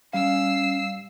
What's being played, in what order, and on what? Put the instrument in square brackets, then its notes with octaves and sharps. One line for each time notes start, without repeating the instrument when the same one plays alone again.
[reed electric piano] G3 F5 [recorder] C#4 [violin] E6 C7